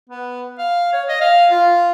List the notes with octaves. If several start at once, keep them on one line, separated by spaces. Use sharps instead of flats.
B3
F5
C#5
D#5
F5
F4